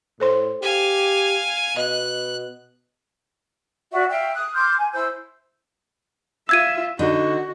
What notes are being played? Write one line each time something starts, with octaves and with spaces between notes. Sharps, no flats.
A2 A4 C5 C6
G4 F5 G#5
B2 D#5 F#6
F#4 D5 E5
E5 F5 G5
D#6 F#6
C6 D6 F6 G6
G#5
E4 C5 E6 G6
F4 E5 E6 G#6 D#7
D3 D4 D#4 F#4